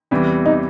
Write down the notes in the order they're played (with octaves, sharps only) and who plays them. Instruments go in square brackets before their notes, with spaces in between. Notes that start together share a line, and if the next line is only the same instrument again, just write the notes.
[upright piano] E2 C3 E3 G3
[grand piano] D#4